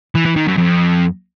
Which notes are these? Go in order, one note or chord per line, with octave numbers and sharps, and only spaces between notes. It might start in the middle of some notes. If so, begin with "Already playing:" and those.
E3
E3
D#3
F#2
F2